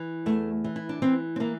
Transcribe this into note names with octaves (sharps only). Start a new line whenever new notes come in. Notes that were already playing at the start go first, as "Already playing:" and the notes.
Already playing: E3
E2 A3
E3
E4
D4
E3 C4
C4
E3 A#3